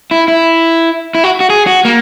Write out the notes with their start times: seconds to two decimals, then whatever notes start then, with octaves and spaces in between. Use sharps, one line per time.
0.11 E4
0.28 E4
1.15 E4
1.24 F#4
1.40 F#4
1.50 G#4
1.67 F#4
1.85 A#3